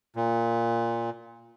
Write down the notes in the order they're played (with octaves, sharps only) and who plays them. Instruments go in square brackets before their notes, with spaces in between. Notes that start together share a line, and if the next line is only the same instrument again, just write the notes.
[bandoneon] A#2